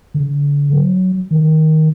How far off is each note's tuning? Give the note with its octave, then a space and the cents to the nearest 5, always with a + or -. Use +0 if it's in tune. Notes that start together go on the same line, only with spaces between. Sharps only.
D3 -35
F#3 +5
D#3 +10